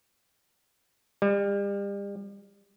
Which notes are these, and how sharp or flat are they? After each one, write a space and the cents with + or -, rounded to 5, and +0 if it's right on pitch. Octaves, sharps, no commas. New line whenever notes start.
G3 +35